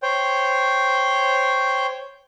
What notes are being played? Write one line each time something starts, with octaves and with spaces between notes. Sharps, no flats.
C5 C#5 G5